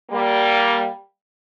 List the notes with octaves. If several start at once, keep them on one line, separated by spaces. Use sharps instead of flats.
G3 A#3